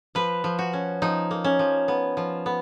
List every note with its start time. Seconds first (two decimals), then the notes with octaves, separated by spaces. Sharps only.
0.15 F3 B4
0.44 F3
0.59 F#4
0.73 C#4
1.02 F3 D#4
1.31 A#3
1.44 C#4
1.59 F3
1.88 B3
2.17 F3
2.46 B3